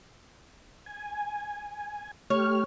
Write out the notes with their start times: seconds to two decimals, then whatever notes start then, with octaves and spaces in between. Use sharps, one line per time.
0.86 G#5
2.30 A3 G4 C#5 F6